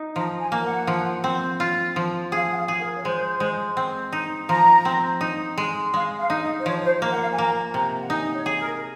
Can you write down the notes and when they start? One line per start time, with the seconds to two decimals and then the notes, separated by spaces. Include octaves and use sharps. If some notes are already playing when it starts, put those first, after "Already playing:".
Already playing: D#4
0.16 F3 A#5
0.40 G#5
0.52 A#3
0.63 F#5
0.87 F3
1.24 C4
1.60 F4
1.96 F3
2.32 G#4 F5
2.50 F#5
2.56 F5
2.68 G#4
2.80 A#4
2.95 C#5
3.04 G#3 C5
3.40 G#3
3.77 C4
4.12 D#4
4.48 F3 A#5
4.85 C4
5.21 D#4
5.58 G#3
5.94 G#3 F5
6.18 F5
6.30 D#4
6.41 D#5
6.59 C5
6.65 F3 C#5
6.83 C5
7.02 A#3
7.09 F#5
7.20 F5
7.31 G#5
7.38 A#3 A#5
7.74 C3 A#5
7.99 F#5
8.10 D#4 G#5
8.34 C#5
8.46 G#4
8.59 A#4